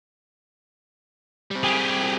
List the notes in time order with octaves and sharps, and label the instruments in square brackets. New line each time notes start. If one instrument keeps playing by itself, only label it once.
[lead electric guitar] G3 C4
[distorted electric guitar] G4 G#4